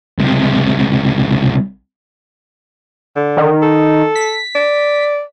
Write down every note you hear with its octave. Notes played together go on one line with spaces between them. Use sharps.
C#2 C3
D3
D#3
A4
B6
D5